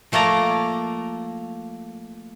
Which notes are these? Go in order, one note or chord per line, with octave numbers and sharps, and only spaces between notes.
F3 A3 A#3 D5 A#5